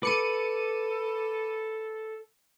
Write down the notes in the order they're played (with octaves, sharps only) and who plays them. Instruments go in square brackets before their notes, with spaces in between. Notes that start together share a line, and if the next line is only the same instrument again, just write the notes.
[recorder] A4 [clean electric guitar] B4 [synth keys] D6 C#7 D#7